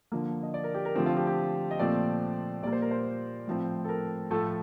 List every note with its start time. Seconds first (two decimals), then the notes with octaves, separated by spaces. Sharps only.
0.12 D3 F3 A#3
0.43 D#5
0.54 D5
0.64 A#4
0.74 G4
0.85 A#4
0.95 D3 F3 A3 C4 G4
1.06 F4
1.17 G4
1.27 G4
1.71 D#5
1.79 A#2 F3 A3 C4 D5
2.63 A#2 G3 A#3 D5
2.72 C5
2.82 A#4
2.91 C5
3.47 A2 F3 C4
3.85 A4
3.89 A#4
4.31 A2 F3 A3 A4